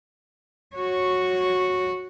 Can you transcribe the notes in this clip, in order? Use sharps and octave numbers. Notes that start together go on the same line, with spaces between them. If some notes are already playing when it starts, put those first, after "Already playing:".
F#4 C#5